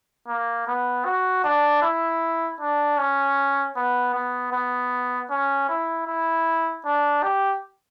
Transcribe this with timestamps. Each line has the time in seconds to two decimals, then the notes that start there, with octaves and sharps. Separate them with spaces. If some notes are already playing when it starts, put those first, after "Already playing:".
0.28 A#3
0.67 B3
1.05 F#4
1.44 D4
1.82 E4
2.60 D4
2.98 C#4
3.76 B3
4.14 B3
4.52 B3
5.30 C#4
5.69 E4
6.07 E4
6.86 D4
7.23 G4